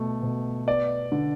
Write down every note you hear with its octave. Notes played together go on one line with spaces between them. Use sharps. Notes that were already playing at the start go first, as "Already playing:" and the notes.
Already playing: B2 A3
B2
B3 D5
D3